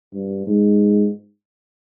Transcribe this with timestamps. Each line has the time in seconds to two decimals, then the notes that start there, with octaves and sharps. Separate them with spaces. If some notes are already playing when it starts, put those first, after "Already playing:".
0.14 G2
0.47 G#2